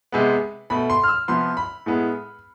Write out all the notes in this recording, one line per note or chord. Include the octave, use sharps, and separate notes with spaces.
C3 G#3 B3
B2 A3 B5
C6
F6
E6
C3 F3 B3 C6
B5
A2 G#3 B3